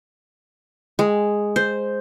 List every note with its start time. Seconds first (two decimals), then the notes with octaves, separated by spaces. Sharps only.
0.99 G#3
1.56 C5